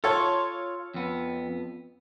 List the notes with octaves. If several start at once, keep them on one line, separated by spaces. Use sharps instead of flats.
F4 A4 C#5
F2 B3